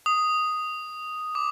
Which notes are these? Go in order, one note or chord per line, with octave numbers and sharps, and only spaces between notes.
D#6
D6